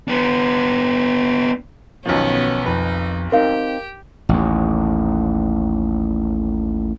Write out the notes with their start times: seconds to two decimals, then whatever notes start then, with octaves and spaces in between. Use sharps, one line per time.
0.08 B3 D4
2.06 B1 B2 D#3 F3 B3 C#4
2.66 F2 D#4 B4
3.32 C4 D#4 G4 A#4 F5
4.29 A1 D#2